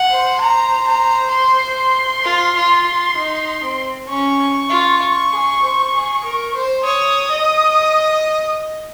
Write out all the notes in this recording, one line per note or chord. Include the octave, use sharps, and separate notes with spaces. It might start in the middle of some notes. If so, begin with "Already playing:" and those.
Already playing: F#5
C5
A#5
A#5
C6
F4
F4
F4
D#4
C4
C#4 C#6
F4
G#4
C5
G#4
A#4
C5
C#5 D#6
D#5